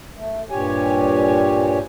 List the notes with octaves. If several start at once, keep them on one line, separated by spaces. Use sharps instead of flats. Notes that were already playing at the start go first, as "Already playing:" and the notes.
A3
G2 A#2 G4 C#5 G#5